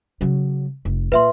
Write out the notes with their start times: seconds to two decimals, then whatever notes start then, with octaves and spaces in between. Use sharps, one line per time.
0.21 C#3 F#3
0.85 F1
1.12 A#2 B4 E5 C6